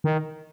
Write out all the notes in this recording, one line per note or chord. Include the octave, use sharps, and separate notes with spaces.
D#3